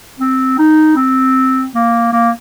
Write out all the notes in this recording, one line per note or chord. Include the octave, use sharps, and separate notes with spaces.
C4
D#4
C4
A#3
A#3